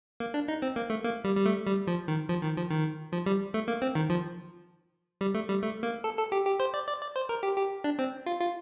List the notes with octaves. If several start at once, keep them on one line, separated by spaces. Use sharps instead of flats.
A#3
D4
D#4
C4
A#3
A3
A#3
G3
G3
A3
G3
F3
D#3
F3
D#3
F3
D#3
F3
G3
A3
A#3
C4
D#3
F3
G3
A3
G3
A3
A#3
A4
A4
G4
G4
C5
D5
D5
D5
C5
A#4
G4
G4
D4
C4
F4
F4